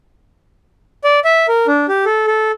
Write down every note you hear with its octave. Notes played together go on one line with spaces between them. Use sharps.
D5
E5
A#4
D4
G4
A4
A4